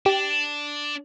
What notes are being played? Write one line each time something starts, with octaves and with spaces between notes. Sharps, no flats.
D4 G4